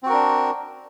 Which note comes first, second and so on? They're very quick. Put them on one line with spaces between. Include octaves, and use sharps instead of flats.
C4 F#4 A#4 D4